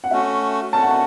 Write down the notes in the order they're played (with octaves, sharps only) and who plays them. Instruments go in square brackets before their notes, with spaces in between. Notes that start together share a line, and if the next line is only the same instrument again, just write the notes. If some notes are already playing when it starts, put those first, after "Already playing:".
[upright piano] F#5
[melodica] A3 C#4 F#4 [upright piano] E5
[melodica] A3 C#4 F#4 [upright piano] A5
[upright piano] F#5
A5